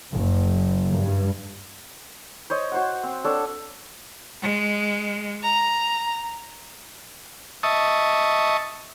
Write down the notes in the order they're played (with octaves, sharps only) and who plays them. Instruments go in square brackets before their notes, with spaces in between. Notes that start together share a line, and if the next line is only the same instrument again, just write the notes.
[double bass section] F#1
G2
[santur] C5 C#5 D#5
F#4 C5 F#5
C4
D4 A4 C#5
[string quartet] G#3
A#5
[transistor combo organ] D#5 E5 A5 C#6 D#6